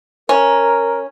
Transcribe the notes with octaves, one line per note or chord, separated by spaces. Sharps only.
C#4 A#4